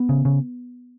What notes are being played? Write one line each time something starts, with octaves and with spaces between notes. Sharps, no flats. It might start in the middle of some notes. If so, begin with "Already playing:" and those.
Already playing: B3
C#3
C#3